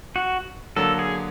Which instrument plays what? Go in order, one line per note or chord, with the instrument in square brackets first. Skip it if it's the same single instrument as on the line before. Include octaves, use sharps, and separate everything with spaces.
[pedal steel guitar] F#4
[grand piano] D3 F#3 A#3 [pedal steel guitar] A4
[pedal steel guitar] G#4